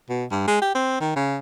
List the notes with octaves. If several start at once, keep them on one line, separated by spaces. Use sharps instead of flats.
B2
G2
G#3
G4
C4
D#3
C#3